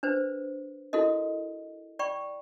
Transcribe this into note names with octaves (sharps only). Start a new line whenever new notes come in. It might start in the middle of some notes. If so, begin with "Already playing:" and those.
D4 B4 C5
E4 F#4 A4 A#4 D#5
D5 G5 B5 C#6